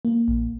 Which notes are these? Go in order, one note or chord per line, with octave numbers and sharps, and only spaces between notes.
A#3
A#1